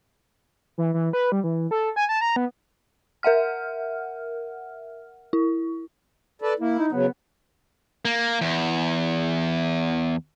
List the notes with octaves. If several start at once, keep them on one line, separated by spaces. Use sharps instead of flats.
E3
E3
B4
G3
E3
A4
G#5
A5
A#5
B3
A#4 E5 F#5 F6
E4
A4 B4 D5
A#3 E4
D#4
C#3 F#3 B3
A#3
E2